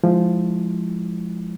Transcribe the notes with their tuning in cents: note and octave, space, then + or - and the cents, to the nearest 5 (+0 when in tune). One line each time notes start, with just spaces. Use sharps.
F3 +0 G#3 +0 E4 -15